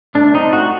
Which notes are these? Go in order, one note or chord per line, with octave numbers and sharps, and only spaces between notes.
A3 D4
C4 D#4
A3 F#4